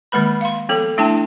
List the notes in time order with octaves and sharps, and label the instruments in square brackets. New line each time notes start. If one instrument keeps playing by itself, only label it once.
[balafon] D#3 G#3 A#3 B4 B5
F5 C6
F3 B3 A4
A3 D4 E4 G5 A5